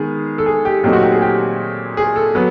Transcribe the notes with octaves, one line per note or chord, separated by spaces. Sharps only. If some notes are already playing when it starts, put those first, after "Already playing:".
Already playing: D#3 G#3 B3 G#4
A4
G#4
G4
A#2 F#3 A3 C4 D#4 G4
F#4
G4
G#4
G4
G#4
A4
F#3 B3